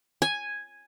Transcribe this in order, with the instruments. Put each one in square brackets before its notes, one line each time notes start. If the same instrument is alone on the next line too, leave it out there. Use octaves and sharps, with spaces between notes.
[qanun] G#5